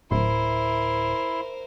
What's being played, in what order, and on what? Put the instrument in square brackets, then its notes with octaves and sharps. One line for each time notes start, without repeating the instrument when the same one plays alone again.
[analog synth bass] D1 [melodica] E4 C6 [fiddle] A#4 C5